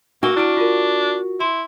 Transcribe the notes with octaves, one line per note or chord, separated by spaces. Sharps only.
A#3 F#4 G#5 E6 G7
D4 E4 F6 D7
F4 A#4
E4 C6